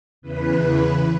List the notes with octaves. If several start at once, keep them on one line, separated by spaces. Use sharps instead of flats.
E2 C#3 E3 B4
B4